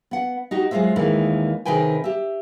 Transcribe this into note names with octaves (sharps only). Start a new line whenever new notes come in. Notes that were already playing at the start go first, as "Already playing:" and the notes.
B3 F#5
D#4 F#4 G4
F#3 G#3 F4 G#4 C5 E5
D#2 D#3 E3 G#3 A#3 E4
C3 D#3 G#4 B4 G5 G#5
G4 E5